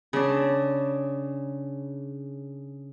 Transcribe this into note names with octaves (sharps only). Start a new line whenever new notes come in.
C#3 D4